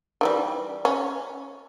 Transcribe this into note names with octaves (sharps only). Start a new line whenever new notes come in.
D#3 E3 G3
C#4